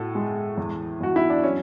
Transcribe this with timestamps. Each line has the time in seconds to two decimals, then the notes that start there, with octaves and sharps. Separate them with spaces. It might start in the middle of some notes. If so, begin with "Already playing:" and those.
Already playing: A2 F#4 A4
0.15 G#3
0.58 E2
1.01 E2 F#4
1.16 E4
1.30 D4
1.43 F#3 C#4